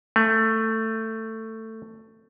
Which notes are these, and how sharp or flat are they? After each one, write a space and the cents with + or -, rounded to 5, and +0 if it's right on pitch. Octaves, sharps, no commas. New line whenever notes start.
A3 +15